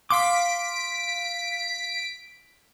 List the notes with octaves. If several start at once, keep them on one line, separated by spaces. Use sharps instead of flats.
F5 C6 D6 B6 D7